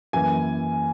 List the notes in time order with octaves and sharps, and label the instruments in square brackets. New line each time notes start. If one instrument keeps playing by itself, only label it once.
[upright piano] F#2 E3 A#3 G#5